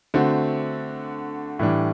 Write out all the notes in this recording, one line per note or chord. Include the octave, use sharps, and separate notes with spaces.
D3 A3 C4 F#4
A2 E3 G3 D4